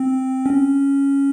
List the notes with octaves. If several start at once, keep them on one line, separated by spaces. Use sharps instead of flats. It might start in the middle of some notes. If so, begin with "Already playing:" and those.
Already playing: C4
C#4